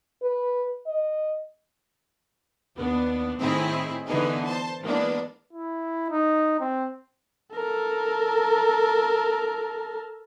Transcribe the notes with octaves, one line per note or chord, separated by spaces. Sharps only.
B4
D#5
D#2 B3 D4
A2 D#3 C4 D#4 E4 G#4
D3 E3 B3 D#4 G#4
C5 A5
E3 G#3 A#3 B3 D4
E4
D#4
C4
A4 A#4